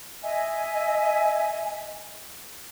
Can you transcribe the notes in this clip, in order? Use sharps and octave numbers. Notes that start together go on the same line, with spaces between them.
D#5 E5 G#5